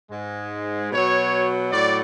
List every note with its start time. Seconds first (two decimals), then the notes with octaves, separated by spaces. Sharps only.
0.11 G#2 G#3
0.92 B2 F#3 C#5
1.72 A2 F#3 D5